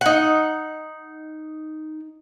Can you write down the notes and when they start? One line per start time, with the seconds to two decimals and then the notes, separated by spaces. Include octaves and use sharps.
0.01 D#4 F#5